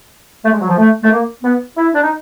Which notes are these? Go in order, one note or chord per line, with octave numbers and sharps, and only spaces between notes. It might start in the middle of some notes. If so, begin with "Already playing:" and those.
A3
G#3
F#3
F3
A3
A3
A#3
B3
E4
D4
D#4